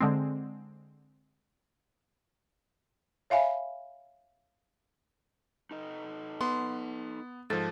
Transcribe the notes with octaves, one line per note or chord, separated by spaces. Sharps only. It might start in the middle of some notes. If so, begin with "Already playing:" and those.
D3 G#3 C4
C#5 E5 F5 G#5 B5
D#4 A4 D#5
B3 C6
G#2 F3 A4